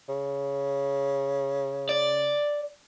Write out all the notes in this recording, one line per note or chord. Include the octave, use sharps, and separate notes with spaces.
C#3
D5